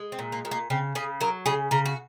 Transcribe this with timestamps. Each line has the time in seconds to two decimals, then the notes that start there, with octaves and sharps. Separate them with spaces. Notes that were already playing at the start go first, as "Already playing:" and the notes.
Already playing: G#3
0.12 C4
0.19 A#2
0.32 A#3
0.45 A#2
0.51 A#3
0.70 C#3 C4
0.95 C#3 G#4
1.21 F#3 A#4
1.46 C#3 G#4
1.71 C#3 A#4
1.85 F#4